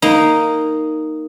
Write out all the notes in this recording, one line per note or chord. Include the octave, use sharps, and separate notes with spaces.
A#3 D#4